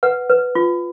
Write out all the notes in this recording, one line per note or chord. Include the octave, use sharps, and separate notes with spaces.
B4 F#5
B4
F4